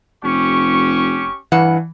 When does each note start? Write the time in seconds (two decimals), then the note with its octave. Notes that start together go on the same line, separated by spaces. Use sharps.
0.24 F1 C#4 G4 C#6
1.52 G2 E3 F#5